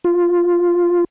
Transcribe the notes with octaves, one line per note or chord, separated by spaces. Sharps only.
F4